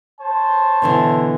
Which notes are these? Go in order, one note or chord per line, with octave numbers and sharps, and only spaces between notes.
C5 C#5 A5
B2 D3 E3